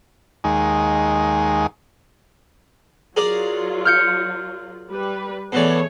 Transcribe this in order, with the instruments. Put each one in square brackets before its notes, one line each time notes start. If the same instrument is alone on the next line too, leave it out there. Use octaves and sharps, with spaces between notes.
[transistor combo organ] D#2 G#3
[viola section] F#3 F4 [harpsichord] G#4 A#4 D5
[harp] F6 G6 C#7
[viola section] G3 B4
[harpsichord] B2 E3 D5 [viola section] A3 G#4 C#5